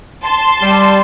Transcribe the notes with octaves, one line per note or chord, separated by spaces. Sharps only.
A5 C6
G3